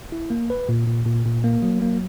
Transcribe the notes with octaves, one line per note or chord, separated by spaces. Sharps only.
E4
A#3
B4
A#2
A#2
A#2
A#2
A#3
F#3
A#3